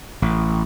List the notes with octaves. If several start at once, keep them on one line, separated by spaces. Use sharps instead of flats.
A1